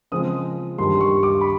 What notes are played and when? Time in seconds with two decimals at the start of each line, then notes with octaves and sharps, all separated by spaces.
0.12 C#3 F3 G#3 C4 D#6
0.78 G2 D#3 G3 C6
1.01 C#6
1.23 D6
1.41 B5